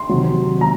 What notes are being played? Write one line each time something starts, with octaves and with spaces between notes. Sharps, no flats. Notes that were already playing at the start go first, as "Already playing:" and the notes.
Already playing: C6
C3 D#3 F#3
F#3 A#5